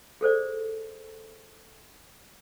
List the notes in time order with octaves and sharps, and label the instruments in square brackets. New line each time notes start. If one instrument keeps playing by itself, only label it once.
[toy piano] G#4 A4 C5 D5